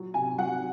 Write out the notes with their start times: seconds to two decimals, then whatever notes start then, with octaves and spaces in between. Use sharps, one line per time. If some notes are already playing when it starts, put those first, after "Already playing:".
Already playing: A#2 F#3
0.14 C3 G#5
0.38 F#3 F#5